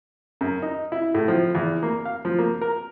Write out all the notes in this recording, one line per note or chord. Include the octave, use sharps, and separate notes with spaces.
F#2
D#4
E4
A2
F3
E2
A#3
F5
F3
A#3
A#4